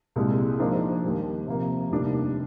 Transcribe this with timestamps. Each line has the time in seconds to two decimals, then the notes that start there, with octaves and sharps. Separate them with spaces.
0.16 C2 A#2 G#3
0.59 G#2 F3 A#3 D4
1.04 D#2 D#3 G3
1.47 C3 F3 A#3
1.91 F1 D#2 D#3 G3 D4